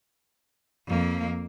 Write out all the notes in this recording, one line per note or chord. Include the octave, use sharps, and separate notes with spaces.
F2 A#3